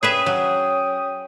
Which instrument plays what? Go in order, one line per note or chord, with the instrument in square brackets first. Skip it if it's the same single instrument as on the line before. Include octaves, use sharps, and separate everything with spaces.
[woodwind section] C#4 G5 D#6 [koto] G#4 B4 E5
[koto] F#3